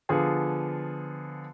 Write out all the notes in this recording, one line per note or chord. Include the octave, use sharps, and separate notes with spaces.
D3 F3 B3 F4 G#4